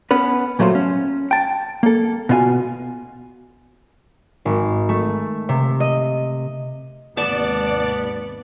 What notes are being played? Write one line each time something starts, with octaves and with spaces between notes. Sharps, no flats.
B3 C#4 B4
A#2 F#3 A3 F4 C5
C#4
G5 A5
A#3 A4
B2 B3 F4 D#5 G#5
G#1
A3
C3
D#5
D#2 G#2 C3 B3 D5 A5